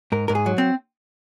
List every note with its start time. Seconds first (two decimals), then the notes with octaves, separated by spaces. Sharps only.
0.12 G#2 A#4
0.28 G#2 A#4
0.35 G#4
0.46 F#3
0.58 C4